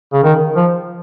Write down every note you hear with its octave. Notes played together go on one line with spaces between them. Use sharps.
C#3
D#3
F3